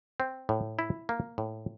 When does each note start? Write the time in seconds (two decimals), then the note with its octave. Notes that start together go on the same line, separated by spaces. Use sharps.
0.20 C4
0.49 A2
0.79 E4
1.09 A#3
1.38 A2